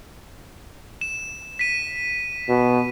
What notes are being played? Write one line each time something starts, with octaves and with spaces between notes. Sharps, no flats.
E7
B6 D#7
B2